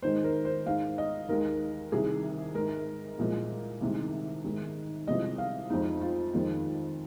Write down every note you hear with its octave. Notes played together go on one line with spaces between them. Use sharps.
G#2 D#3 G#3 C5
A#4
C5
G#2 G#3 F5
D#5
D#2 D#3 G#3 A#4
C2 C3 D#3 G#4
G#2 G#3 A#4
C2 A#2 F3 G#3
C2 C3 D#3 G#3
G#2 D#3 G#3
C2 C3 F3 G#3 D#5
F5
F2 F3 G#3 D#4
F4
F2 D#3 G#3